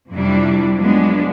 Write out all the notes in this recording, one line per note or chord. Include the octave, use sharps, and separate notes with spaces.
F2 C3 G3 D4 E4
F3 F#3 G#3 B3 D4